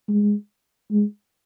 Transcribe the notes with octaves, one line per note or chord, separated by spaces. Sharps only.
G#3
G#3